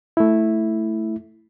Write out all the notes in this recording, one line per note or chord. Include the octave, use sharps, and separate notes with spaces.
A3 E4